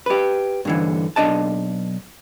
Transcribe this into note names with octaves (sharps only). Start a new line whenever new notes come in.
G4 B4
G2 D3 E3
B1 D4 D#5 A5